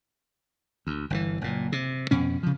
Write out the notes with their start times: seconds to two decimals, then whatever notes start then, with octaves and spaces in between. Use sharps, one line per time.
0.87 D2
1.10 G1 A#2 E3
1.41 F#1 A#2
1.72 C3
2.11 F2 B2 C#4
2.43 C#3 F3